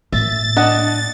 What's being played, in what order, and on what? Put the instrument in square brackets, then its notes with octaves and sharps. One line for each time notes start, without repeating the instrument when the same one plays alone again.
[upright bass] A2 A#3 [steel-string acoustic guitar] E5 [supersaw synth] A6
[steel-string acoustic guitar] D4 [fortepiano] D#5 F#5